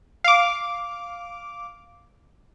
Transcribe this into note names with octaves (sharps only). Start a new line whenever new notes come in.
F5 D6